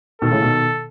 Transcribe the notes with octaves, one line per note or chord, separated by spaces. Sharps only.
B2 D#3 A4
A2 C#3
B2 D#3